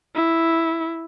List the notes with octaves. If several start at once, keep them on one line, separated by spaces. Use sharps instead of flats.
E4